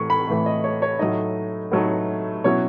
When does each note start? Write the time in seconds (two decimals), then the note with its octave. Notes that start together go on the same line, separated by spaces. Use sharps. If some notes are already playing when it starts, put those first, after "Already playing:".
Already playing: A2 E3 C#6
0.10 B5
0.27 A2 E3 A3
0.46 D#5
0.64 C#5
0.82 C#5
0.99 A2 F#3 A3 D#4 D#5
1.72 A2 F#3 A3 D#4
2.44 B2 F#3 C#4 E4 C#5